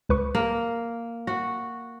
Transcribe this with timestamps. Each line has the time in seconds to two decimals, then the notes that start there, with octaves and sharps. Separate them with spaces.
0.09 C#2 B4 C#6
0.35 A#3
1.27 F#4